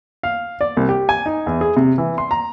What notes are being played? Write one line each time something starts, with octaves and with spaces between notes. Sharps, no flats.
F5
D5
C2
G4
G#5
D#4
E2
G#4
C3
E3
C6
A#5